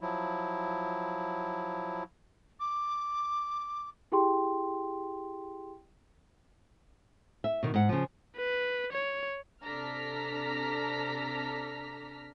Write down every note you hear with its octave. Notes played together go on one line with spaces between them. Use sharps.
F3 F#3 E4
D6
E4 G4 G#4 G5 C6
E5
B2 D#3
G#2 F#5
C#3 F3
B4
C#5
C3 D4 A4 A#5 F6 B6